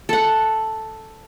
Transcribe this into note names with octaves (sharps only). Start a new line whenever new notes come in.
A4 F#5